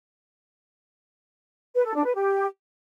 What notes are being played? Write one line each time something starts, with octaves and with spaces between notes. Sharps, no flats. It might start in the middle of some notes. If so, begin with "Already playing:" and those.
B4
A4
D4
B4
G4